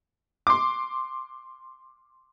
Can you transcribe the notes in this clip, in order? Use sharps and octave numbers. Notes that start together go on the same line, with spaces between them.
C6 D6